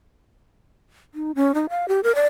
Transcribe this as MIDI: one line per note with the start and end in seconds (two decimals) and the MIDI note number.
1.14 1.32 63
1.35 1.54 61
1.54 1.66 63
1.70 1.88 77
1.88 2.01 67
2.03 2.14 70
2.15 2.27 74